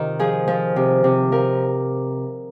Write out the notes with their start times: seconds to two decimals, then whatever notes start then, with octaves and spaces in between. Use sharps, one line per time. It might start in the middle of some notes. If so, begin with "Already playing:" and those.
Already playing: C3 D#3 F4
0.19 F3 G#4
0.48 F3
0.76 C3
1.04 C3
1.32 F3 A#4